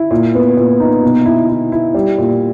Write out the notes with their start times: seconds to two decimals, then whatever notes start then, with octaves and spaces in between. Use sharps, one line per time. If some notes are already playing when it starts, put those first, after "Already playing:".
Already playing: E4
0.11 A#2
0.35 B3
0.57 A#2
0.80 D#4
1.03 B2
1.26 E4
1.49 E4
1.72 E4
1.94 G3
2.18 A#2